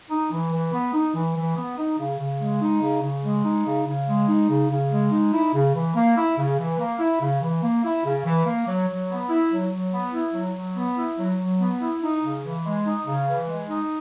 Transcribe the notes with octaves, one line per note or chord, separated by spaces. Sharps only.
D#4
E3
E3
B3
D#4
E3
E3
B3
D#4
C#3
C#3
G#3
D#4
C#3
C#3
G#3
D#4
C#3
C#3
G#3
D#4
C#3
C#3
G#3
D#4
E4
C#3
E3
A#3
E4
C#3
E3
A#3
E4
C#3
E3
A#3
E4
C#3
E3
A#3
F#3
F#3
B3
E4
F#3
F#3
B3
E4
F#3
F#3
B3
E4
F#3
F#3
B3
E4
D#4
C#3
E3
G#3
D#4
C#3
E3
G#3
D#4